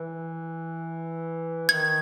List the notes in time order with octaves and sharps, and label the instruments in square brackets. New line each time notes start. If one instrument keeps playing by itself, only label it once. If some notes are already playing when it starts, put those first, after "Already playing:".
Already playing: [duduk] E3
[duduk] D#3 [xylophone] G#6